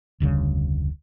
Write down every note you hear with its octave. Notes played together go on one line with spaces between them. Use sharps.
F1 D2 C#3 G3